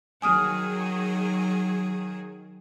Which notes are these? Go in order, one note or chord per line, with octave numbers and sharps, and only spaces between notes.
D#3 F#3 G#4 G#5 D#6 F6